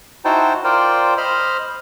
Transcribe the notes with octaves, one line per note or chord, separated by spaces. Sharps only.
D#4 E4 F#4 C5 G5 A5
F4 A#4 C5 D5 G5
C5 D#5 B5 F6